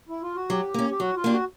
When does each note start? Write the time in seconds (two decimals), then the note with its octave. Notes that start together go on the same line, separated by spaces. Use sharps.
0.09 E4
0.22 F4
0.36 F#4
0.50 F#3 G4
0.74 A#3 C#4
0.90 G4
1.00 F#3 F#4
1.16 F4
1.24 A#3 D4 G4
1.32 F#4